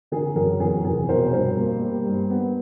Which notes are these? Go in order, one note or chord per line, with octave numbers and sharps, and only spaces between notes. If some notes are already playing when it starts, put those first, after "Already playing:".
D3 G#4 A#4
F#2 G#4 A#4
E2 G#4 A#4
F1 G#4 A#4
B2 A#4 C5
G2 A#4 C5
A#3
G3
G2
B3